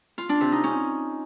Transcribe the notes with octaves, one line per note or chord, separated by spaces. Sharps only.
F4
D4
C3
D#4
C#4